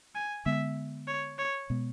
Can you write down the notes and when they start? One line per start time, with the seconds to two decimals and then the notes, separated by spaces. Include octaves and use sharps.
0.15 G#5
0.46 D3 G#3 B3 E5
1.08 C#5
1.39 C#5
1.70 B2 G#3 B3